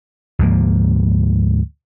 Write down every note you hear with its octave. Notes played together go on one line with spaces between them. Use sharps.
D2 G#2 F3 A#3